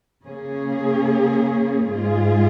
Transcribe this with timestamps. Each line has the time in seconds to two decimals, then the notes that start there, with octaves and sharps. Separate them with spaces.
0.25 C#3 A#3 C#4 G#4
1.90 G#2 G#3 F4 G#4